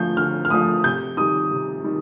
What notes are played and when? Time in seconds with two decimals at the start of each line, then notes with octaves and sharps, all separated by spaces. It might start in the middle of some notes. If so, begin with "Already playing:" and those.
Already playing: D3 F3 A3 G6
0.17 D3 F6
0.45 F6
0.50 F3 A3 D#6
0.84 C3 G6
1.17 D#3 G3 D#6
1.51 C3
1.84 D#3 G3